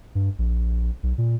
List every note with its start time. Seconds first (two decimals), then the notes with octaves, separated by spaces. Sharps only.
0.15 G2
0.39 A#1
1.03 B1
1.18 A#2